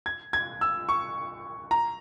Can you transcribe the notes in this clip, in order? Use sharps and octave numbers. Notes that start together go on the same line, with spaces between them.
G#6
G#6
E6
C#6
A#5